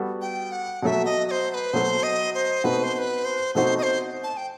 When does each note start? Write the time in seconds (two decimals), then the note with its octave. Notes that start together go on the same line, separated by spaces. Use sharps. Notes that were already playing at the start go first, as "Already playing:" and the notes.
Already playing: G3 B3 F#4 A4
0.21 G5
0.52 F#5
0.82 B2 F#3 A3 E5 F#5
1.05 D#5
1.28 D#5
1.31 C5
1.50 C5
1.54 B4
1.73 B2 F#3 A3 C5
2.03 D#5
2.34 C5
2.64 B2 A3 C4 D#4 F#4 B4
2.83 C5
2.94 C5
2.98 B4
3.25 C5
3.55 B2 A3 C4 D#4 F#4 C5
3.78 D#5
3.83 C5
4.23 A5
4.37 G5